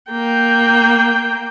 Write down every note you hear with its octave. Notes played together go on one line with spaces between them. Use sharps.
A#3 G5